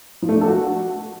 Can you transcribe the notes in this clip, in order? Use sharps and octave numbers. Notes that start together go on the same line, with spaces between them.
F3
A3
D4
A4
F#4